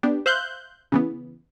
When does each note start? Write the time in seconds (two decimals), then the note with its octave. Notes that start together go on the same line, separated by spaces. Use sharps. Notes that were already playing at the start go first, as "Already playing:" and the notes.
0.03 B3 D4 G4
0.26 C5 E5 F5 F#6 G6
0.92 C#3 E3 B3